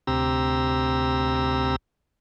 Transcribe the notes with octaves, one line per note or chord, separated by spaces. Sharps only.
D2 C3 C4 G4 A#5 E6